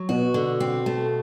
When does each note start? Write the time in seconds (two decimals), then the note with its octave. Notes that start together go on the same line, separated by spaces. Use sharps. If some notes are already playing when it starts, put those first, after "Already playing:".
Already playing: F#3
0.09 B2 F#4
0.34 D3
0.60 C4
0.86 A3